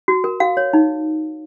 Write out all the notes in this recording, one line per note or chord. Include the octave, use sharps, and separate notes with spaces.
F#4
A#4
F#4 F5
C#5
D#4